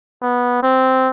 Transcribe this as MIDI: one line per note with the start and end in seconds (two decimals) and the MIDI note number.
0.22 0.63 59
0.63 1.11 60